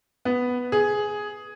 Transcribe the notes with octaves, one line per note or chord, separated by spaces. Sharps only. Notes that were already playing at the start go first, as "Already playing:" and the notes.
B3
G#4